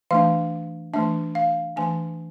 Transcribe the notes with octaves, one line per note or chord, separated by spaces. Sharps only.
E3 A3 D4 F5
E3 A3 D4 E5
F5
E3 A3 D4 G#5